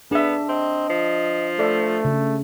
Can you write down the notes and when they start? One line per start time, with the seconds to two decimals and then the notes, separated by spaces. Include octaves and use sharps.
0.11 B3 D4 G#4 E5
0.49 C4 D#5
0.89 F3
1.59 A3 A4 D5 E5
2.05 C#3